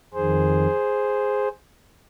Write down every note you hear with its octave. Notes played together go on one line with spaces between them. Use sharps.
F2 D#3 G#4 C5